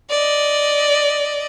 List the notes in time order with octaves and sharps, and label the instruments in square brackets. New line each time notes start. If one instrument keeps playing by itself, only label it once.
[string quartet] D5 D#5